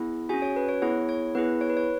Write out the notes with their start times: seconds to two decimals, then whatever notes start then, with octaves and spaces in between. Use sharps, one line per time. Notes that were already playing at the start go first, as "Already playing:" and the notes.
Already playing: B3 E4 G#4
0.29 F#4 G#4 G#5
0.34 C#4
0.42 C#5
0.56 B4
0.69 C#5
0.82 B3 E4 G#4 C#5
1.09 C#5
1.35 B3 E4 G#4 B4
1.61 C#5
1.70 B4
1.77 C#5